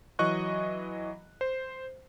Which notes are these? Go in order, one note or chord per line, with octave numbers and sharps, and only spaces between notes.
E3 F#3 D#5 C#6 F#6
C5